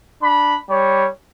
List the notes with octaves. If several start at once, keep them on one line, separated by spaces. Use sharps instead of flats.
D4 B5
G3 C#5